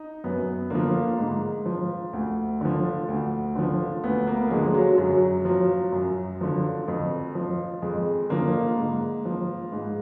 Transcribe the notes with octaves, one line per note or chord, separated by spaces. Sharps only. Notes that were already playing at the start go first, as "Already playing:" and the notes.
Already playing: D#4
F#2 B3
D3 F3 A#3
G#2
F3
D2
D3 F3
D2
D3 F3
D2 B3
A#3
D3 F3 G#3
F#3
F#2 F#3
F3 F#3
F#2
D3 F3
F2
F3
F2 G#3
D3 F3 A#3
G#2
F3
G#2